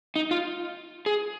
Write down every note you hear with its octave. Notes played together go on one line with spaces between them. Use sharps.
D#4
F4
G#4